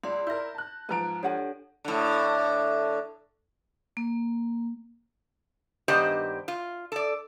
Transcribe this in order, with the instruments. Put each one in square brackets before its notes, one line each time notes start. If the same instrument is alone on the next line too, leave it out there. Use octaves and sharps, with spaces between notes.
[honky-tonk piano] C#2 [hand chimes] D5 C6
[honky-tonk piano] E4 A#4 [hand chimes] G6 A#6
[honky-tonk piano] A5 F#6
[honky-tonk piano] G#2 F3 D7 [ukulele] B4 A#5
[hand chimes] D4 G4 A4 [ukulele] C#5 F#5 G#5
[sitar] A2 D3
[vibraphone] A#3
[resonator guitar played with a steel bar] G2 D#3 B3 G4 C5 D#5
F4
A4 D5